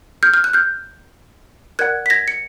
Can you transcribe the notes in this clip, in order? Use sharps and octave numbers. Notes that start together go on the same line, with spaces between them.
F6 G6
F6
F#6
F6 G6
A#4 D5 F#5 F#6 G#6
B6
G#6 A#6
C#7